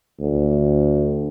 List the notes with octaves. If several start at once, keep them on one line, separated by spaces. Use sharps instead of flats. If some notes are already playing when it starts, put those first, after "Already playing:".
D2